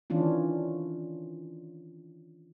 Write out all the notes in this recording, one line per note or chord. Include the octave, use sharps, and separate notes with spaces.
D#3 E3 C#4 D4 F4